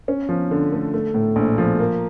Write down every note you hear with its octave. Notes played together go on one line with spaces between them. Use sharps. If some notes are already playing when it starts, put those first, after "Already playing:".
C#4
F3
D3
A3
A3
A2
A#1
F3
A#3